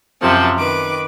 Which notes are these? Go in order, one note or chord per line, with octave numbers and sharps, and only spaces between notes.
F#2 C3 F3 A5
D#3 B4 D6